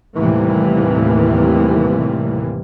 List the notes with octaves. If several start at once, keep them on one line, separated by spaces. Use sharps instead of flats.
D#2 A2 C3 E3 G3 A#3